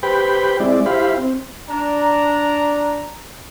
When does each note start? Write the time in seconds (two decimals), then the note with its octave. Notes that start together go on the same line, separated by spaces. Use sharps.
0.03 G4 B4 C5 G5 B5
0.60 G#3 C4 E4 D5
0.86 E4 G4 C5 F5 B5
1.18 C4
1.69 D4 A#5